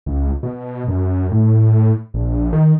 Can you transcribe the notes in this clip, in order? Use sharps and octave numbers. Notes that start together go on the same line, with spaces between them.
C#2
B2
F#2
A2
A#1
D#3